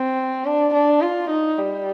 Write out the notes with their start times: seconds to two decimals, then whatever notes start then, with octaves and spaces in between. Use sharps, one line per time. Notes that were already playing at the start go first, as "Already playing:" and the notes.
Already playing: C4
0.45 D4
0.73 D4
1.02 F4
1.30 D#4
1.58 G3